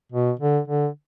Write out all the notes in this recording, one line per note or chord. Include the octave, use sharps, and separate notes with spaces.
B2
D3
D3